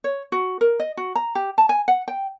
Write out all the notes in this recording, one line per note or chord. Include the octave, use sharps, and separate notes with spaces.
C#5
F#4
A#4
D#5
F#4
A#5
G4
A5
G#5
F#5
G5